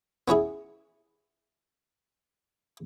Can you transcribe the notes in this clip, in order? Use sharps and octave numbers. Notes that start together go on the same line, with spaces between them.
B3 C#4 E4 G#4